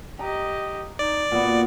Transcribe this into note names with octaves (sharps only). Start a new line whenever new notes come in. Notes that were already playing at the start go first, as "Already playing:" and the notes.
G4 D#5 A#5
D#4 D5
A#2 B3 F#4